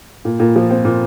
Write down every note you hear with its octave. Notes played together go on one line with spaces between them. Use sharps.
A#2
A#2
F3
C4
A#2